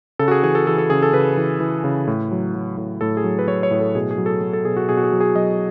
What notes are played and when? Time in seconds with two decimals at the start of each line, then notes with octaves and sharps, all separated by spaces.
0.19 C#3 A4
0.28 F#4
0.31 G#4
0.43 E3 G#4
0.55 A4
0.67 E3 A4
0.78 A4
0.90 C#3 G#4
1.02 A4
1.13 C#3 B4
1.37 E3
1.60 E3
1.84 C#3
2.07 A2
2.32 F#3
2.55 F#3
2.77 A2
3.01 A2 A4
3.17 G#4
3.24 F#3
3.39 B4
3.48 F#3 C#5
3.63 C#5
3.71 A2
3.80 A4
3.95 B2 G#4
4.11 G#4
4.18 F#3
4.26 A4
4.41 F#3
4.53 A4
4.65 B2 G#4
4.77 F#4
4.89 B2 G#4
4.97 F#4
5.04 G#4
5.13 F#3
5.20 G#4
5.35 F#3 D#5